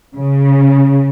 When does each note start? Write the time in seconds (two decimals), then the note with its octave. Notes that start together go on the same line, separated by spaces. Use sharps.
0.15 C#3